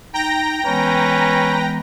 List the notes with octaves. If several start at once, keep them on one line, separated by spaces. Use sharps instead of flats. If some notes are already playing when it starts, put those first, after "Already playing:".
D#4 G5 A#5 A#6
E3 G#3 B3 C#4 B4